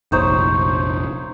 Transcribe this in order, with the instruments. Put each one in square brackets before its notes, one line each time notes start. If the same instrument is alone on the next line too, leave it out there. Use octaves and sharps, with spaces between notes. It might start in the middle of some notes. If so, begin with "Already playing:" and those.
[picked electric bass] F1 A#1 [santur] D#4 C5 C#5